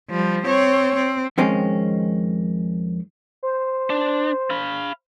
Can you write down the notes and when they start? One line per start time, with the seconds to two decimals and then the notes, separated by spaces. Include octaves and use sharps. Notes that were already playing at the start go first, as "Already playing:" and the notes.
0.10 F3 G3
0.45 C4 C#5
0.95 C4
1.38 F2 D#3 G#3 C4 C#4
3.43 C5
3.90 D4
4.50 F5 B5